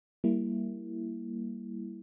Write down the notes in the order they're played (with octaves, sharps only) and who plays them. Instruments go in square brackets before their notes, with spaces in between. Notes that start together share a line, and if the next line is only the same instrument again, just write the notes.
[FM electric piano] G3 A#3 E4